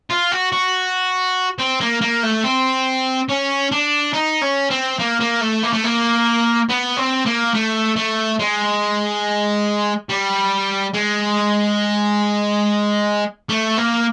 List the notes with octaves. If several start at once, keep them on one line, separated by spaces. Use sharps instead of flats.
F4
F#4
F#4
C4
A#3
A#3
A3
C4
C#4
D4
D#4
C#4
C4
A#3
A#3
A3
A#3
A3
A#3
B3
C4
A#3
A3
A3
G#3
G3
G#3
A3
A#3